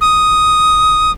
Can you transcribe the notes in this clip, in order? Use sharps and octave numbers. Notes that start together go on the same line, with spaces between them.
D#6